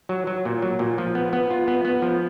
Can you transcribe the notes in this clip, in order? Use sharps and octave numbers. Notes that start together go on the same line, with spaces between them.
F#3
F#3
A#2
F#3
A#2
F3
B3
B3
F4
B3
B3
F3